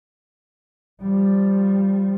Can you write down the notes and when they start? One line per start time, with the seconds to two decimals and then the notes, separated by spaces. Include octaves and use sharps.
1.02 F3 G3